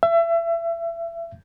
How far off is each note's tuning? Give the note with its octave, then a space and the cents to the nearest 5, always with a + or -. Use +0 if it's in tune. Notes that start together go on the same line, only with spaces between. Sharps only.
E5 +30